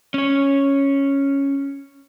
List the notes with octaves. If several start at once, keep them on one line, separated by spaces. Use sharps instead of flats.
C#4 C#5